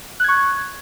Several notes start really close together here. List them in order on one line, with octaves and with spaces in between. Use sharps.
F#6 G#6 C#6